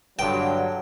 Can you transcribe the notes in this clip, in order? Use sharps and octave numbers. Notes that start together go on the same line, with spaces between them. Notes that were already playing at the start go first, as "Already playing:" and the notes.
G2 D3 F#3 G5